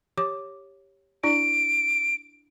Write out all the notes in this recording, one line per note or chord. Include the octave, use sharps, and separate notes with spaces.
G4 C#5 D6
D4 E4 D5 D7